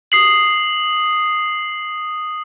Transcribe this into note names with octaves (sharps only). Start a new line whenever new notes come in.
D#6 C7 F#7